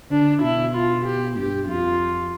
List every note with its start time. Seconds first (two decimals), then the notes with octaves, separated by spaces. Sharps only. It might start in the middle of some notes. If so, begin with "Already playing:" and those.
0.11 D3 D4
0.42 B2 E4
0.74 F4
1.05 G4
1.36 G2 G4
1.68 F2 F4